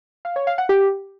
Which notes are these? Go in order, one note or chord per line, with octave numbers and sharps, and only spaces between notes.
F5
C#5
F5
F#5
G4